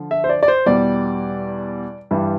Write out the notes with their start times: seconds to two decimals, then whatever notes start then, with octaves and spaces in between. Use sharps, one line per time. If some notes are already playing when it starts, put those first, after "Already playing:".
Already playing: D3 F3
0.11 E5
0.24 C5
0.29 D5
0.43 D5
0.48 C5
0.66 E2 B2 G3 D5
2.11 G2 E3 G3